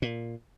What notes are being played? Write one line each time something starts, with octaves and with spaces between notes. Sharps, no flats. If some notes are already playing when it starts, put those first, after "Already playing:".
A#2